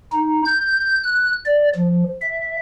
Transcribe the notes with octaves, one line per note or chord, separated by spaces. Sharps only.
D#4
G6
F#6
D5
F3
E5